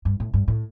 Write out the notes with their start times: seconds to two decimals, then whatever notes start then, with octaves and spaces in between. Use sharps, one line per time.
0.05 G2
0.20 A2
0.34 G2
0.48 A2